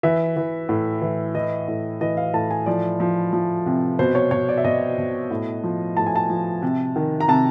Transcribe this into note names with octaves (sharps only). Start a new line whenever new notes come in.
E3 E5
E3
A2
E3
E3 D#5
A2
E3 D#5
F5
A2 A5
G#5
F3 D5
F3
F3
C3
B2 C5
C#5
B2 C#5
D5
E5
B2 D#5
B2
A2
F3
A2 A5
G#5
A5
F3
C3
D#3
A#5
C3 A5